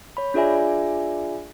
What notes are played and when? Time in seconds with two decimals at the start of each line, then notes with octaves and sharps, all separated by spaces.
0.17 C#5 B5
0.34 D4 F4 G#4 D5 E5 G#5